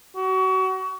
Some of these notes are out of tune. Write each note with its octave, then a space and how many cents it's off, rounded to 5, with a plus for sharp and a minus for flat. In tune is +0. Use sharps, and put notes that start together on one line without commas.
F#4 +30